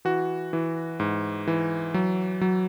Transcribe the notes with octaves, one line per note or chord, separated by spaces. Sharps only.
E3 F#4
E3
G#2
E3
F#3
F#3